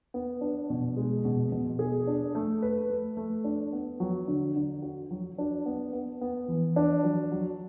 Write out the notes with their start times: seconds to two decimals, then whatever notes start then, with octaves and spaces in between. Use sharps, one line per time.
0.14 B3
0.41 D4
0.70 B2
0.97 G#3
1.25 B2
1.52 B2
1.79 G#4
2.07 D4
2.35 A3
2.62 B4
2.90 A3
3.17 A3
3.44 D4
3.73 B3
4.00 F#3
4.28 D3
4.56 D3
4.82 F#4
5.11 F#3
5.38 D4
5.66 B3
5.93 B3
6.21 B3
6.48 E3
6.76 D4
7.04 F#3
7.32 F#3